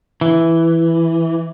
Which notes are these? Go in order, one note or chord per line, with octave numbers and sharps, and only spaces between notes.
E3